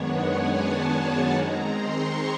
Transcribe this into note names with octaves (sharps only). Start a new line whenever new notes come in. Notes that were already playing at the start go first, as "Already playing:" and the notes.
Already playing: F#2 D#3 G#3 B3 D4 C#5 F#5
G#5
A5
D#3 G#3 C4 A#5
C6
C#6